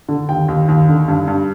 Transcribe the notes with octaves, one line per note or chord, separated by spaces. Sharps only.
D3
D#2 G5
D#2
D#2
D3
G2
G2